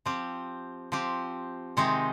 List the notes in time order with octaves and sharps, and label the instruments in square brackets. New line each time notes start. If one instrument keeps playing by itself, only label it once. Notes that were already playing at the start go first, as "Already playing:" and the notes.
[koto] F3 C4 G4
F3 C4 G4
C3 D#3 G#3 C4 D#4